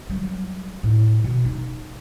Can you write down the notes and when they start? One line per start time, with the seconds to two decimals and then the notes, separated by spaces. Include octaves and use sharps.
0.10 F#3 G3
0.83 A2
1.24 B2
1.45 D#4